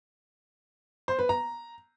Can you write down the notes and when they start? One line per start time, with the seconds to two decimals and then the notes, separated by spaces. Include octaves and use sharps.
1.08 C5
1.19 B4
1.29 A#5